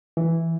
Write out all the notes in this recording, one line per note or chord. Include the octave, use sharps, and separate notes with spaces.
E3